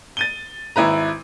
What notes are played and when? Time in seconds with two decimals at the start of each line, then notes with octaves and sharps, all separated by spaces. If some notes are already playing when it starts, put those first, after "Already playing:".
0.17 A6 D#7 G7
0.76 G#1 E4 B4 A#5